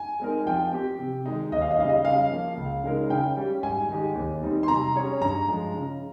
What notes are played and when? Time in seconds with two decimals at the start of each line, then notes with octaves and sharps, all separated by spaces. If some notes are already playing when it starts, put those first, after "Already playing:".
Already playing: G#5
0.20 G#3 C4 D#4 A#4
0.46 F3 G5
0.72 C4 G4
0.99 C3
1.26 D#3 G#3 D#4
1.52 D#2 D#5
1.61 F5
1.71 D#5
1.79 C#3 G3 F5
1.89 D#5
2.05 C#3 F5
2.31 F3 A#3
2.57 C#2
2.84 C#3 G#3 D#4 A#4
3.10 C#3 G5
3.37 G3 C#4 G4
3.63 G#2 G#5
3.89 D#3 G#3 D#4 G4
4.15 D#2
4.42 D#3 G3 C4 D#4
4.63 C6
4.68 C3 A#5
4.95 G3 C#4 G#4 C#5
5.21 G2 A#5
5.48 F3 G#3
5.74 C#3